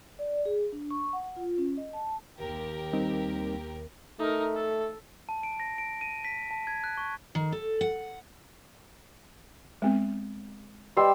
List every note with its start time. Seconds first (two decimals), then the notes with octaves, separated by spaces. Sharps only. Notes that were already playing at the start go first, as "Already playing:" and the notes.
0.19 D5
0.46 G#4
0.72 D4
0.90 C#6
1.13 F#5
1.24 F#5
1.36 F4
1.58 C#4
1.77 D#5
1.93 A5
2.39 D#2 G4 A#4
2.93 G3 C4 D#4
4.19 A3 D#4 A#4
4.55 A4
5.29 A5
5.43 D7
5.60 A#6
5.78 D7
6.01 D#7
6.24 B6
6.51 A5
6.67 G#6
6.84 F#6
6.97 C#6
7.35 D#3
7.52 A4
7.81 F#5
9.82 G#3 B3 C4
10.97 G3 B4 D#5 C6 E6